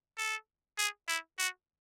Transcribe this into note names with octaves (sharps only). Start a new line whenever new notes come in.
A4
G#4
E4
F#4